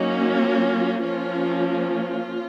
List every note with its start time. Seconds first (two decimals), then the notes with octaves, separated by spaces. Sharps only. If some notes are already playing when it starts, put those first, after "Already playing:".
Already playing: F#3 A#3 C#4 D#4
0.37 F4
1.05 F3 A#3 C#4 F4
1.73 F4